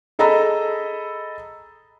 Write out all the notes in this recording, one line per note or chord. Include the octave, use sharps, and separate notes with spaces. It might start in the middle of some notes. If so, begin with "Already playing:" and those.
G#4 A4 D#5 A#5 B5 E6